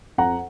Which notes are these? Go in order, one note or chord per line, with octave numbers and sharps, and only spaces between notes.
F2 F#5 A#5